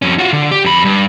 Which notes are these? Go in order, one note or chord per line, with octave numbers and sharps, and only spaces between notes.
F2 C#4
F4 F#4
D3
G4
F2 B5
G2